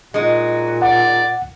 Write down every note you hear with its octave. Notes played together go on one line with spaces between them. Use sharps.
A#2 G#3 D#4 F#4
D5 F#5